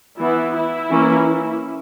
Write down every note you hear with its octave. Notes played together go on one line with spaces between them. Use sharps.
E3 B3 E4
E4
E3 A#3 C#4